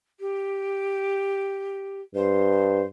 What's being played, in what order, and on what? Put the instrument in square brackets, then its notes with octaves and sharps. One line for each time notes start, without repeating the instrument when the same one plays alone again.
[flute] G4
[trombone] G2 [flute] C5